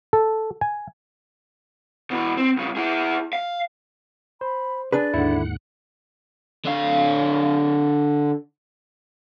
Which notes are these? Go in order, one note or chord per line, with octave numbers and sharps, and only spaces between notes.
A4
G#5
B2 E3
C4
C2 C#3
E4 G#4
F5
C5 B5
D4 G#4 B4 D5
D#2 G#2 D3 E4 F#5
D3 F5